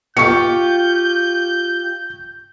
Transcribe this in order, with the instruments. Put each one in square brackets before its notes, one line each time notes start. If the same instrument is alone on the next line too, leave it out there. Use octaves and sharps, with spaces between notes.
[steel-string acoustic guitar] F4 G4 [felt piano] C#6 C#7 [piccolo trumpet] G6